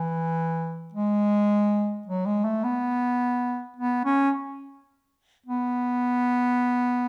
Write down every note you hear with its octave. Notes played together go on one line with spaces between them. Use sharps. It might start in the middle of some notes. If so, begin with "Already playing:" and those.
Already playing: E3
G#3
F#3
G#3
A3
B3
B3
C#4
B3